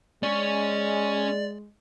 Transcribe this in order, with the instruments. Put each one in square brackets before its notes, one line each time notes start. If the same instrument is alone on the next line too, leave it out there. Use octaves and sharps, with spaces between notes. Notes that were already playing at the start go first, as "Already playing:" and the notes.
[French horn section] G#3 [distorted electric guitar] C#4 C#5 [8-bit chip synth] D5